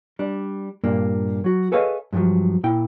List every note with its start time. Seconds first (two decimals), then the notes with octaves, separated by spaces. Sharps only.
0.19 G3 D4
0.84 G2 A#2 A#3 D4
1.44 F#3 F#4
1.72 G#4 A4 B4 C#5 D#5 F5
2.13 G2 A#2 D3 F3 F#3
2.64 A#2 E4 G5